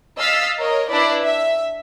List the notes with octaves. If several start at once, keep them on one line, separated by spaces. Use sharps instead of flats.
D#5 F5 E6 A6 B6
A#4 C#5 D#5
D4 E4 B4 D5
E5